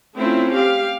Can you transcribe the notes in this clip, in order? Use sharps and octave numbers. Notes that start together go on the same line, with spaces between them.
A3 C4 C#4 E4 F4
G4 F5